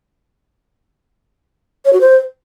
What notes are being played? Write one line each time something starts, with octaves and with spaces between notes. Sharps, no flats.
C#5
F#4
C5